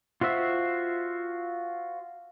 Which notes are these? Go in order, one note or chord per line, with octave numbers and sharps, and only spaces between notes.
F4 F#4 C5 E5